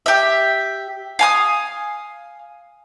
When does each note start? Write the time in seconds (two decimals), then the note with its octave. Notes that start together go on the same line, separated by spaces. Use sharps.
0.06 G4 E5
1.19 F5 G#5 D#6